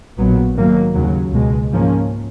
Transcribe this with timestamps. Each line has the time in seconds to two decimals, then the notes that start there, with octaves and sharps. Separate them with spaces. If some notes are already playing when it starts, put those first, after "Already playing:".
0.18 A#1 A#2 F#3 B3
0.57 G#2 D#3 F#3 A#3
0.94 D#2 C#3 F#3
1.33 C#2 B2 G#3
1.71 G#2 F3 A#3 C#4